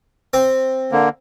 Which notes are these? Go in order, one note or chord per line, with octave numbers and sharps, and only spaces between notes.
C4
D3 A#3